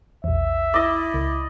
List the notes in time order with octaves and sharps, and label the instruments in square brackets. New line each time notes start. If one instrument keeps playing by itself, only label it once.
[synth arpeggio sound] A#1 E2 [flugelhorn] E5
[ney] E4 [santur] D5 D#5
[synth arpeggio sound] C#2